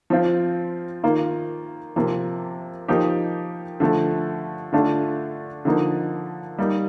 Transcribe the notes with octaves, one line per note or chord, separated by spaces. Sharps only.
F3 C4 F4
D#3 A#3 F4
C3 F3 A#3
F3 A#3 D#4 G4
D3 F3 A3
D3 A3 D4 F4
D3 F3 A#3 D#4
G3 A#3 D#4